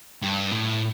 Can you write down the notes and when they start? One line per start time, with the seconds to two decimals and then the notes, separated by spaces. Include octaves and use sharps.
0.22 G2
0.51 A2